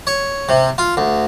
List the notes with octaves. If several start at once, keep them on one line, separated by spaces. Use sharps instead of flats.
C#5
C3
F4
D2